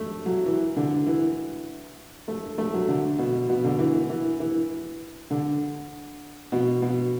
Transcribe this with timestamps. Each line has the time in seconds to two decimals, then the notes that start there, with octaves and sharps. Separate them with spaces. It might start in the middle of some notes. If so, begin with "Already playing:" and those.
Already playing: A3
0.26 F#3
0.46 E3
0.76 D3
1.06 E3
2.28 A3
2.58 A3
2.74 F#3
2.88 D3
3.18 B2
3.49 B2
3.64 D3
3.79 E3
4.10 E3
4.40 E3
5.30 D3
6.52 B2
6.82 B2